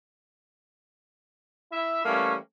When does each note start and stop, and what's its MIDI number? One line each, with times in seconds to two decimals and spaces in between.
1.72 2.04 64
1.72 2.04 76
2.05 2.35 52
2.05 2.35 55
2.05 2.35 57
2.05 2.35 58
2.05 2.35 61